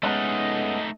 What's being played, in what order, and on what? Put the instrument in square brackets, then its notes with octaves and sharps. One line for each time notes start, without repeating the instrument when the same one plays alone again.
[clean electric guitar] G#3 B3 C#4 [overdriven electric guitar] A3 D#4 [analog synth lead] D#5